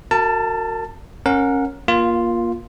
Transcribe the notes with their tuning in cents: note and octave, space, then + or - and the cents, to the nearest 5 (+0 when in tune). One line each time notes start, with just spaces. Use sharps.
F#4 +0 A#4 -35 A5 +10
C#4 -15 A#4 -5 F#5 -30
A#3 +20 F4 +0